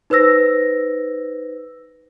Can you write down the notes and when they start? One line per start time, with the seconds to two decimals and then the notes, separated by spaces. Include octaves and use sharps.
0.10 D#4 B4 C5 E6 A#6